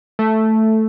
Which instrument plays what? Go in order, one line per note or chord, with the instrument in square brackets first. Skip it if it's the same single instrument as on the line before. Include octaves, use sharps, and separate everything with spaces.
[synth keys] A3